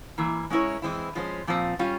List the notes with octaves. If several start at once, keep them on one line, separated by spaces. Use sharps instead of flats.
E3 A#3 E4
G#3 C#4 E4 A#4 C#5
E3 G#3 C4 E4
F3 G#3 C#4 F4 C5
A#2 F3 C4
G3 C#4 F4